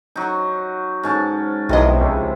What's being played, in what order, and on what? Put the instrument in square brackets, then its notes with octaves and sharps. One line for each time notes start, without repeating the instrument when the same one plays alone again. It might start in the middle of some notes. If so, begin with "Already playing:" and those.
[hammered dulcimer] F#3 D#4
G#2 C#4 A5
[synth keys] B1 D#5 [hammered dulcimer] C3 F3 E4
[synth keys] C#2